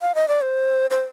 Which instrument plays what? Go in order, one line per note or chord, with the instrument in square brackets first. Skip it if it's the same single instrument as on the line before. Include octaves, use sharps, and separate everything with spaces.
[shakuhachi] F5
D#5
D5
C5
C5